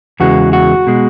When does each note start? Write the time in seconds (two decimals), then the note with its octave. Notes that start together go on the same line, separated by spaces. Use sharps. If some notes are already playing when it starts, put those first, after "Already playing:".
0.20 E2 C#3 E3 G#3 F#4
0.53 F#4
0.87 B2 G#3